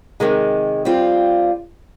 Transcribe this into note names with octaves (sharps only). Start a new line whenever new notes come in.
C3 D#3 G#3
G3 C4 F4